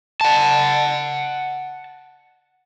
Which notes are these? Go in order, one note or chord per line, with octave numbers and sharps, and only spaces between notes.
F#5 A5